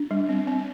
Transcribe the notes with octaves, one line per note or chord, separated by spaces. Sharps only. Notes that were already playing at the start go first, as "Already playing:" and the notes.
Already playing: D4
G3
C4
C4